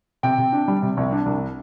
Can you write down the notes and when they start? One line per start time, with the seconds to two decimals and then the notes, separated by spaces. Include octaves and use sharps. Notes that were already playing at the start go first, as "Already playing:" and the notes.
0.23 C3 G5
0.38 C3
0.52 D4
0.68 G3
0.82 C3
0.97 C2
1.12 D4
1.26 C2